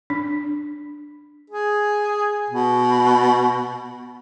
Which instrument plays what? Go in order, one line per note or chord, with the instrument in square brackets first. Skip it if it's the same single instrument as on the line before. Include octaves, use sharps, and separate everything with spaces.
[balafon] D4
[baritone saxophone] G#4
B2